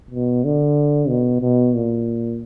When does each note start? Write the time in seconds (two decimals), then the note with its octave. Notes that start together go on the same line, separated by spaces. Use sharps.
0.11 B2
0.44 D3
1.09 B2
1.41 B2
1.74 A#2